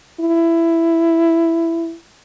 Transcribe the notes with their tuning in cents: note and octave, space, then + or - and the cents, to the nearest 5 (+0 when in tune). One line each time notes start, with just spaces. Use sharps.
E4 +10